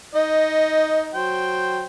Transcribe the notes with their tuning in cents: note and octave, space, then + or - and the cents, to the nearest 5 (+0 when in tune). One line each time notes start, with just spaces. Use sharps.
D#4 +15 D#5 +0
F#3 +0 C5 +0 G5 +0